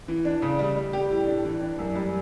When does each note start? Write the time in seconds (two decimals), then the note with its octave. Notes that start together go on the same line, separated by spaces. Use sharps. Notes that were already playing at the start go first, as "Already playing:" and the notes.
0.08 E3
0.25 D4
0.42 C#3
0.59 G3
0.76 G3
0.93 G4
1.11 A2
1.27 D4
1.45 E3
1.61 D4
1.79 F#2
1.95 G3